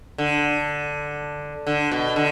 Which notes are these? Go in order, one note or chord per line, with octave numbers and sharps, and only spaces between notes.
D3
D3
B2
D3